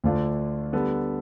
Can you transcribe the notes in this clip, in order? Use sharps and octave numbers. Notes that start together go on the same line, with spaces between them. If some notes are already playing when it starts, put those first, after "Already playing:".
D2 D3 A3 D4 F4
D3 G3 B3 D4 A4